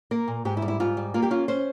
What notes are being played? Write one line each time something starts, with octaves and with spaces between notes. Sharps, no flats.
A#3 A#4
A#2
G#2 G4
E4
G3
E4
G#2 F4
G3
A#3 F4
G4
C#4 F4
C#4 C5